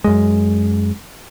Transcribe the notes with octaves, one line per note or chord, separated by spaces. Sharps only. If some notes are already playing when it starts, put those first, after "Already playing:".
F#2 G#3